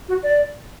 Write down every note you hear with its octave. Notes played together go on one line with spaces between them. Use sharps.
F#4
D5